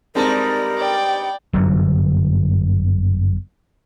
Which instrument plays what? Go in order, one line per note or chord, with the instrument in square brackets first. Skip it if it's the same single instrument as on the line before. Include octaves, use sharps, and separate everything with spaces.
[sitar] G2 G3 D#4 [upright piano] G#3 C4 A5 [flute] A#4
[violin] D5 G5
[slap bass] G1 F#2 D3 F#3